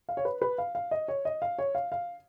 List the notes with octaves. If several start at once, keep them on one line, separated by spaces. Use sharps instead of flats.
F5
C#5
B4
B4
F5
F5
D#5
C#5
D#5
F5
C#5
F5
F5